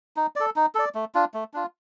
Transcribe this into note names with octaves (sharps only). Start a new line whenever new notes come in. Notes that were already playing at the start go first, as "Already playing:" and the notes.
D#4
A4 D5
D#4
A4 D5
A3
D4 F4
A3
D4 F4